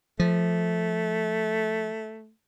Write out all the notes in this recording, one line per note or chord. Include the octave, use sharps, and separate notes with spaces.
F3 A3